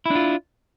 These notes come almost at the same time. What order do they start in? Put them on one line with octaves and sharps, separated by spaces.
E4 D4 F4